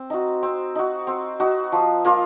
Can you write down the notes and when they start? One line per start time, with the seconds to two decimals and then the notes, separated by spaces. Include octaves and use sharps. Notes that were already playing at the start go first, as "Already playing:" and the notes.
Already playing: C4
0.10 D#4 F#4
0.43 C4
0.75 D#4 F#4
1.07 C4
1.40 D#4 F#4
1.72 F3
2.05 A#3 F4